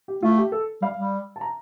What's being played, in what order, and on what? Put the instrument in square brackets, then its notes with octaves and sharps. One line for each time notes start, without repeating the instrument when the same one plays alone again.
[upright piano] G4
[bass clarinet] A3 [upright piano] F4
[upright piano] G4
A4
[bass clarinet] G3 [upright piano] F5
[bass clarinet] G3
[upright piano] A5
A#5